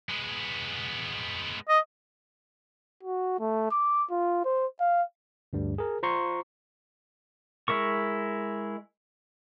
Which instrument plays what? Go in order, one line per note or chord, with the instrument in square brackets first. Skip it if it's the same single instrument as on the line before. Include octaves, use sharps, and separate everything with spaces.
[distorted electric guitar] G#3 B3
[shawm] D#5
[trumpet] F#4
A3
D6
F4
C5
F5
[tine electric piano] D2 G2 G3
G#4 A#4
F4 C5 A#5 C6 C#6
[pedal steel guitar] G#3 E4 A#4 C#6